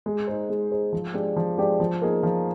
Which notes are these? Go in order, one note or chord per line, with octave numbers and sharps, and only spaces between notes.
G#3
D#4 G#4 C5
G#3
D#4 G#4 C5
F3
G#3 D4 G4 D5
F3
G#3 D4 G4 D5
F3
A#3 D#4 G#4
F3